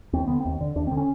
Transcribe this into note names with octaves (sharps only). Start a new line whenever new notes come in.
D#2 C4
D3 B3
D#2 C4
D3
D#2 D4
C4
D3
C#4